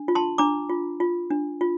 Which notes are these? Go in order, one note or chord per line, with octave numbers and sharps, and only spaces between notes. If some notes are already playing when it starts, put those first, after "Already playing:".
Already playing: D4
F4
A5 C6
D4 A#5 D6
F4
F4
D4
F4